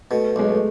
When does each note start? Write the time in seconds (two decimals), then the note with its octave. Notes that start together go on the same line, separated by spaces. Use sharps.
0.11 B2 A3
0.36 B1 G#3
0.48 A3